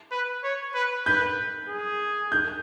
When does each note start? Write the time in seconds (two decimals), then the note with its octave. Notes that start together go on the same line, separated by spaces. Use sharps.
0.12 B4
0.44 C#5
0.74 B4
1.06 B4 G6
1.69 G#4
2.32 G6